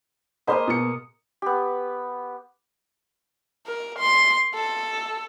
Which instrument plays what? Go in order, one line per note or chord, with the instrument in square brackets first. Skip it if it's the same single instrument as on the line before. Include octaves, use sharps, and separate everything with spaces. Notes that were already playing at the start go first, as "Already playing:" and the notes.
[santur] G#3 A#3 D#6 [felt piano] C5 D#5 B5
[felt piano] B2 C#7
[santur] B3 G4
[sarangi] A#4
C6
A4